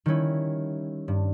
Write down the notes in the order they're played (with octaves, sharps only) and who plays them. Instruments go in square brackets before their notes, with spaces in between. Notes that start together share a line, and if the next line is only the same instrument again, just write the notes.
[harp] D#3 G3 C#4 E4
G2